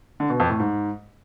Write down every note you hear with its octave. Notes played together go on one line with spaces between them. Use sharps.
D3
B2
F2
A2
G#2